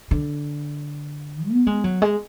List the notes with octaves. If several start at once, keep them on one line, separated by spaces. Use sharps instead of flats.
D3
B3
G#3
F#3
G#3